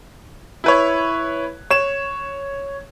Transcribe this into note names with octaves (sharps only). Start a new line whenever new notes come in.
E4 B4 C#5
C#5 E7